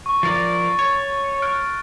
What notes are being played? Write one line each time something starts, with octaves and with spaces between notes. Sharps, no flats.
C#6
F3 A#4 D5 A6
C#5
F6 F#6 D7